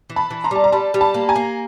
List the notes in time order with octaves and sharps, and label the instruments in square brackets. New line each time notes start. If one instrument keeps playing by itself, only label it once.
[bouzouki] E3
[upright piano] A5 B5
[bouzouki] E3
[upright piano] A#5 C6
[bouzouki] G3 [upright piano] A5
[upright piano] A#5
[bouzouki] G3 [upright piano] A5 B5
[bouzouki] G3
[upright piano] A5 B5
[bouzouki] A#3
[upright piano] G#5 A#5
[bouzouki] A#3